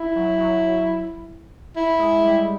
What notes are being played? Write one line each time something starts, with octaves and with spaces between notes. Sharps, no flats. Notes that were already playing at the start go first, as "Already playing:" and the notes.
Already playing: E4
F#3
F#3
E4
G#3
G3